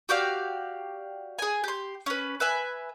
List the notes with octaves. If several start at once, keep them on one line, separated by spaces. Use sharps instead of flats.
F#4 G4 D5 F5
G#4 G#5
G4 C6
C#4 B4
B4 E5 G#5